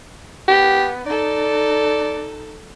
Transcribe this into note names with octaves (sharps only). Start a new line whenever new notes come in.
B3 G4
D#4 A4 D5